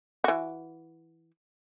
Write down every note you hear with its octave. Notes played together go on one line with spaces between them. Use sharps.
E3 F#4